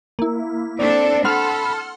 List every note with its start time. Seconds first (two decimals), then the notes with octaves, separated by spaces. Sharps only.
0.19 A#3 E4
0.79 C4 D4 A4 D5
1.25 A4 F#5 B5 C6 F6